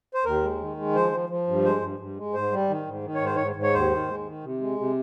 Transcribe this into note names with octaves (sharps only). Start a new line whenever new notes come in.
C5
D#2 A#4
G#3
D#3
G#3
F3 C5
F3
F3
G2
G#3 C5
G2
G2
G#3
G#2 C5
G3
D#3
G#2
D#3
C#5
G#2 C5
G#2 C#5
G#2
C#5
D#2 C5
D#3
G#3
D#3
C3
G#3
C3